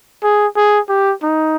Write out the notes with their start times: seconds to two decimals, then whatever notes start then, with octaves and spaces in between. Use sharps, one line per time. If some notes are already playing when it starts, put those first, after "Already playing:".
0.23 G#4
0.56 G#4
0.89 G4
1.23 D#4